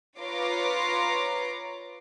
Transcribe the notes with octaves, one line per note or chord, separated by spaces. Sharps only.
F4 B4 C#5 A#5 C6 D6